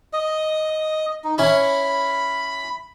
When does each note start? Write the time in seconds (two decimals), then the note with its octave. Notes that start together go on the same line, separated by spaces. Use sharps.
0.13 D#5
1.24 D#4
1.38 C#4 E4 B5